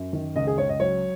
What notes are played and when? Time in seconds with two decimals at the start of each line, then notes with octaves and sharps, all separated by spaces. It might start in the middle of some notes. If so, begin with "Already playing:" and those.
Already playing: F#2
0.13 D#3
0.36 C#2 D#5
0.47 G#4
0.58 C#2 C#5
0.69 D#5
0.80 F#3 C#5